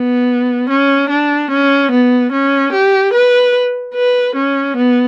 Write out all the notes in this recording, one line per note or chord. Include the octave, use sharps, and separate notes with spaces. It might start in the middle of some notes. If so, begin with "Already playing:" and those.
Already playing: B3
C#4
D4
C#4
B3
C#4
G4
B4
B4
C#4
B3